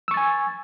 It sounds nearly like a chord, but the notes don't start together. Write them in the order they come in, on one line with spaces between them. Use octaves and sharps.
E6 C#6 A6 G#5